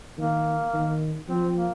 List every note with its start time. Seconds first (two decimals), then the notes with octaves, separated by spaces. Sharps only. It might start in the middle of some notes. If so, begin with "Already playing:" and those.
0.18 D#3 A#3
0.73 D#3
1.28 F3 C4
1.56 A#3